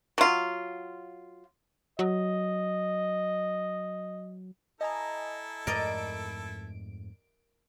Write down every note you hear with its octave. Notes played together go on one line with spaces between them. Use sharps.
F#3 F4
F#3 D#5
E4 A4 D#5 G#5 A#5
F2 G#2 A3 A#4 D5 D#5 D7